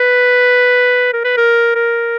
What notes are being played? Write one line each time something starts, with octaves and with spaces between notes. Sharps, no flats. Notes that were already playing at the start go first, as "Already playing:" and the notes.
Already playing: B4
A#4
B4
A#4
A#4